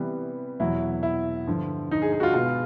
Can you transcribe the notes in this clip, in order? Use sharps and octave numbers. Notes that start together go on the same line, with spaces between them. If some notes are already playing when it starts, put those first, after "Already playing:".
Already playing: C3 E3 G3 B3
E2 B2 F#3 E4
E4
G2 D3 F3
D#4
G#4
G#4
F#4
F4
B2 G#3 B3 F4